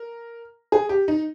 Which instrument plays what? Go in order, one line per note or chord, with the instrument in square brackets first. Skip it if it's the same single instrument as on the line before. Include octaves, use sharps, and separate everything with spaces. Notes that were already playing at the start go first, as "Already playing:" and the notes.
Already playing: [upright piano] A#4
G#4
G4
D#4